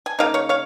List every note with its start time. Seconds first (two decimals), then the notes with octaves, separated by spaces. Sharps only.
0.06 G#5
0.19 C#3 A#3 D#4 F5
0.34 C#5 F5
0.49 C#5 F5